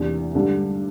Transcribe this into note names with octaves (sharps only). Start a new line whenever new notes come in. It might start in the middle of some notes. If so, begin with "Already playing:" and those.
Already playing: E2 C3 E3 A#3 D4
G2 D3 G3